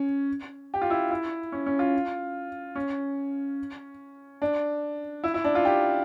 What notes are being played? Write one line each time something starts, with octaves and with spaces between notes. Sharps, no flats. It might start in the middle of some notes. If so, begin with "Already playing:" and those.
Already playing: C#4
G4
F4
E4
E4
C#4
C#4
F4
C#4
D4
E4
E4
D4
F4
G4